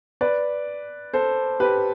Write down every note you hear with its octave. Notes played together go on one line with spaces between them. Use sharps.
B4 D5
A4 C5
G4 B4